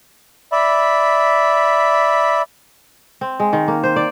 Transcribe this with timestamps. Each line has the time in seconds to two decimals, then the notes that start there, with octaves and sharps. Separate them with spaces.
0.52 D5 E5 B5
3.21 C4
3.40 G#3
3.53 D#3
3.68 A#3
3.83 C5
3.96 D5